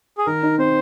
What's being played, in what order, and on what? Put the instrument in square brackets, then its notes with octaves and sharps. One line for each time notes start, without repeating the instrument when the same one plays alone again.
[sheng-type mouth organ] G#4
[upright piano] D#3 [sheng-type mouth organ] A#4
[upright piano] D#4
[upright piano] C4 [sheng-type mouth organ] C5